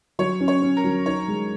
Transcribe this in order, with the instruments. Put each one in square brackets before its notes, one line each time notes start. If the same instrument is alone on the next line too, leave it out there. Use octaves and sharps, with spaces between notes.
[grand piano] F#3 [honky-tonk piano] C#5
[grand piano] C#4
[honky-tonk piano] C#5
[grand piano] C#4
[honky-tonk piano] A#4
[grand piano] F#3
[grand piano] D#4 [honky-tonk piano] C#5
[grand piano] G#3